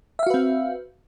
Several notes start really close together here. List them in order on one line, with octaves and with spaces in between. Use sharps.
E5 F5 F#4 B4 C4